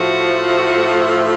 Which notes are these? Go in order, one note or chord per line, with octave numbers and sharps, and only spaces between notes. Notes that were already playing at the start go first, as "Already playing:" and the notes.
Already playing: A2 F3 A3 F#4